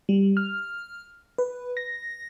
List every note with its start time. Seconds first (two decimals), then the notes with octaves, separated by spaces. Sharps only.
0.09 G3
0.37 F6
1.38 B4
1.77 A#6